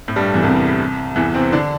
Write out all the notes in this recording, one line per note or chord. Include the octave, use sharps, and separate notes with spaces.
A2 A3
G2 G3
E2 E3
C2 C3
E2 E3
C3 C4
D3 D4